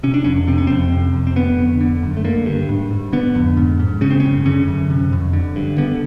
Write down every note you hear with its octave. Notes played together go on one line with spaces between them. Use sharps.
C3 C#4
D4
F2 C#4
C3 C4
C#4
F2 C4
C3
F2
C4
D3 B3
F2
D3
F#2
A3
D3 A#3
G2
G#2
G#2
D3 B3
F2
G#2
G#2
C#3 C#4
C4
C#4
F#2
D3 C#4
F#2
C3
F2
D3
G2
D3 B3